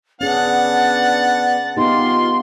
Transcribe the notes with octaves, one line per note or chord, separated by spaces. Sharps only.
B3 C#4 D4 G#4 F#5 A6
B3 D#4 F4 G4 C6